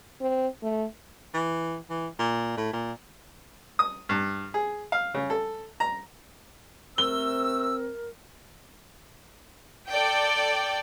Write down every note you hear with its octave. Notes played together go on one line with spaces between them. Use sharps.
C4
A3
E3
E3
A#2
A2
A#2
D#6
G2
G#4
F5
C#3
A4
A#5
C3 A3 C4 A#4 E6 G7
A4 D5 G5